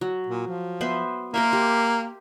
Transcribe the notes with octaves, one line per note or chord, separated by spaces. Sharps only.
F#3
A#2
F3
B3 C5 E5
A#3 A#4 C5 E5
G4